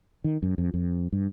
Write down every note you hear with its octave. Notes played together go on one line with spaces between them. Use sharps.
D#3
F#2
F2
F2
G2